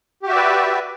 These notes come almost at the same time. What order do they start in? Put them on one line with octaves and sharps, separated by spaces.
G4 F#4 E5 D5 B4